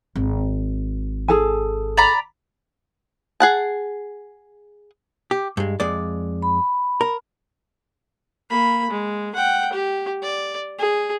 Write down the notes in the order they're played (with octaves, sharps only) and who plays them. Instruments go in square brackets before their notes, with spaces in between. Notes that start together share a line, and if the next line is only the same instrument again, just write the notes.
[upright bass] G#1
[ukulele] G#4 A4 G#5
[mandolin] D5 A#5 B5
[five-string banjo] G#4 F#5 A5
[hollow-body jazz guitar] G4
G2 G#3
F2 G#3 D5
[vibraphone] B5
[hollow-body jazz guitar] A#4
[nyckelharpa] A#3 B5
G#3
F#5 G5
G4
D5
G#4